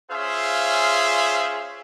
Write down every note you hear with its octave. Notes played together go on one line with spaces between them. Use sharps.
C#4 F4 G#4 C5 E5 F5